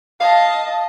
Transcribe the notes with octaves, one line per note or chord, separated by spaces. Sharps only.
D#5 F5 A5